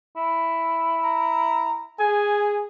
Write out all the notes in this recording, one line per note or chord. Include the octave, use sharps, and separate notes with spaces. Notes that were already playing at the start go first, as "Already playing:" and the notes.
E4
A#5
G#4 G#5